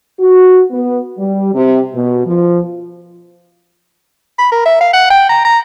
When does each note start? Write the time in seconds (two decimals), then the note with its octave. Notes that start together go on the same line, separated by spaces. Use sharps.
0.19 F#4
0.71 B3
1.18 G3
1.54 C3
1.95 B2
2.26 F3
4.38 B5
4.52 A#4
4.66 E5
4.81 F5
4.93 F#5
5.10 G5
5.29 A#5
5.45 A#5